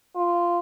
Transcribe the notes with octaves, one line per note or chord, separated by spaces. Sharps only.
F4